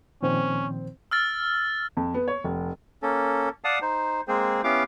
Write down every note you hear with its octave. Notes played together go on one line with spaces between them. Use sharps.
A#2 D#3 F3 C4 C#4
E6 F6 A6
F2
B3
C#5
F1
A#3 C#4 A4
D5 F5 F#5 A5 D#6
D#4 C5
G#3 A#3 C4 G#4 C5
B3 C#4 E4 G4 F5 D6